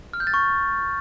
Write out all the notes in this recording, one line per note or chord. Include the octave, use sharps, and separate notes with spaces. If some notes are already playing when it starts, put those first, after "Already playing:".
F6
G6
A6
C#6